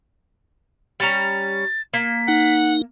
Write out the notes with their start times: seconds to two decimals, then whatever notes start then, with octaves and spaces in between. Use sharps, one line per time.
1.00 G3 C#4 A#5 A6
1.94 A#3 B6
2.28 D#4 F#5